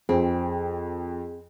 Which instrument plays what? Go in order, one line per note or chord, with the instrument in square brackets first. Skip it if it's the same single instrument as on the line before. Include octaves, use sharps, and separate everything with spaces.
[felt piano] F2 [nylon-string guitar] C4 [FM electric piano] G#4